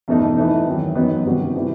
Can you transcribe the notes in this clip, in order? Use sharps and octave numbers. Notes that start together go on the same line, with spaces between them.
E2 B2 A3 D#4
E3 A3 D#4
E2 D#3 F#3
F#2 F#3 B3 D#4
C3 D#3 G3 B3 F#4
C3 E3 G3 C4